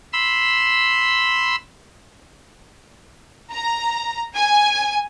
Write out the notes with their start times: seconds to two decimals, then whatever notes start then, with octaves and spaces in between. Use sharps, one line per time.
0.13 B5 C6 E6
3.52 A#5
4.35 G#5